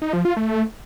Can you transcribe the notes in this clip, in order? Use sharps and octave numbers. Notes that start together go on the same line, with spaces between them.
D#4
F3
F4
A3